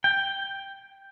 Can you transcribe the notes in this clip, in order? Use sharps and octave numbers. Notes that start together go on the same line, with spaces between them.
G5